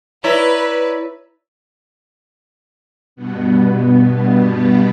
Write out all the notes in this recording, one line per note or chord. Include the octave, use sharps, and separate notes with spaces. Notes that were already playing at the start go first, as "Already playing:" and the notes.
E4 B4 C#5 D5 A#5
G2 B2 B3